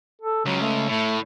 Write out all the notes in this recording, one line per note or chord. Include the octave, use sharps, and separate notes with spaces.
A4
C#2 C#3 F#3
A3
A2 A3